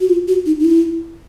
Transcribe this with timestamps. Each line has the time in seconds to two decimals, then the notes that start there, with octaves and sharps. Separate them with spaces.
0.01 F#4
0.09 F4
0.28 F#4
0.46 D#4
0.60 D#4
0.65 E4